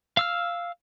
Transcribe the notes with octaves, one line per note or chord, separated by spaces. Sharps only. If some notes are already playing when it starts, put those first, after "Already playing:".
F5 E6 F6